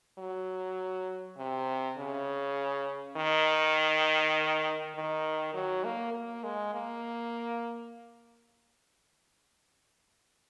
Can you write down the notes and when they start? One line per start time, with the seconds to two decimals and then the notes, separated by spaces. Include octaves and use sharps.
0.19 F#3
1.38 C3
1.98 C#3
3.17 D#3
4.96 D#3
5.54 F#3
5.84 A#3
6.14 A#3
6.44 G#3
6.74 A#3